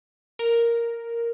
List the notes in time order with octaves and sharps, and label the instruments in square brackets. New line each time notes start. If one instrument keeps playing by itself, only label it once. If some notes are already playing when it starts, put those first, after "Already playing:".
[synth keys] A#4